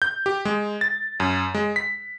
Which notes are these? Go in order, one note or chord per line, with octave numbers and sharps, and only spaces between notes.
G6
G4
G#3
A6
F#2
G#3
B6